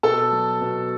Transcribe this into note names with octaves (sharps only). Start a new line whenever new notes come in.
B2 A4 A5
F#3
B2